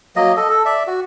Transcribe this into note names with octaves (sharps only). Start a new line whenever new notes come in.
F#3 A#3 D#5
A4 D#5
A4
D5 E5
F#4